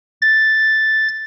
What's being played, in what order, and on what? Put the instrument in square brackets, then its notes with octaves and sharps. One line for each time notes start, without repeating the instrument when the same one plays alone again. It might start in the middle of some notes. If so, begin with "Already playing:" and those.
[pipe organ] A6